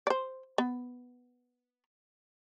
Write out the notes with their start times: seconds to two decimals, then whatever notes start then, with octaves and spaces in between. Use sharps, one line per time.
0.07 C5 D5
0.58 B3